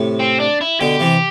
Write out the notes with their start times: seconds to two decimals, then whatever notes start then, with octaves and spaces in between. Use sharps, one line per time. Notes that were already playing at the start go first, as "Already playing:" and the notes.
Already playing: A2 C3
0.20 C4
0.40 D4
0.61 E4
0.80 B2 D3 G4
1.00 C3 E3